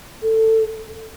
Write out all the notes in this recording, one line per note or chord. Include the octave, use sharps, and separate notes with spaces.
A4